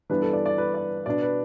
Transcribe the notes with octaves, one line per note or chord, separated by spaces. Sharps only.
G2 E3 B3 D4 B4
A4
D5
D5
B4
D5
B2 B3 D4 D5
B4